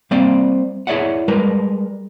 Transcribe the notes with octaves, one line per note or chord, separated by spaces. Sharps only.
G3 A#3 C4 D5
E4 G#4 C#5 D5 E5 F#5
G3 G#3 A#4 B4